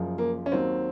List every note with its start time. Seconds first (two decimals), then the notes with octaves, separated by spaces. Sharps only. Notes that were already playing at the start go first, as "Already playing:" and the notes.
Already playing: F#1 F#2 F3
0.18 A#3
0.46 C#4
0.52 D#2 D#3 F#3 C4